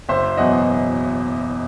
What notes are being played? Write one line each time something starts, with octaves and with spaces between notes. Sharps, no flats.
F#1 C5 E5
E2 B2 F#3 D#5 F#5